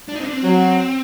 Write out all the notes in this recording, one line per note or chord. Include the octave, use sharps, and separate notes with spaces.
D4
D#4
C4
D4
C4
F#3